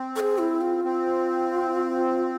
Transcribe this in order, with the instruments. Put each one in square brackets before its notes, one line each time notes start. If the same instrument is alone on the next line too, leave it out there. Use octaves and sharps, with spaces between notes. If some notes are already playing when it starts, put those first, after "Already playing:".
Already playing: [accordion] C4
[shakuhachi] A4
G#4
E4
F4
[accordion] C4